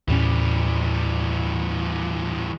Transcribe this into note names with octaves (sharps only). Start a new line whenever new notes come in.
D#2 A2 E3 G3 C#4